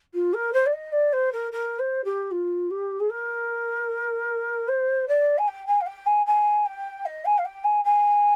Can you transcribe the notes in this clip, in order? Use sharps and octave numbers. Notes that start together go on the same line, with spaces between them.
F4
A#4
C5
D5
D#5
D5
C5
A#4
A#4
C5
G4
F4
G4
G#4
A#4
C5
D5
G#5
G5
G#5
F5
G5
G#5
G#5
G5
D#5
G#5
F5
G5
G#5
G#5